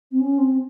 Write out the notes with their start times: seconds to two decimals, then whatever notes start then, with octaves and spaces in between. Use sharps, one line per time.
0.11 C4
0.20 C#4
0.37 C4